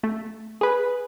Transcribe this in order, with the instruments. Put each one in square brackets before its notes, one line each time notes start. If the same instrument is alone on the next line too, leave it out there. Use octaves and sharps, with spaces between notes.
[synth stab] A3
G#4 B4